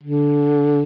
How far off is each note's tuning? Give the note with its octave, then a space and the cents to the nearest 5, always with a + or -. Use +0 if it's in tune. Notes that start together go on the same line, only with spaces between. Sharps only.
D3 -15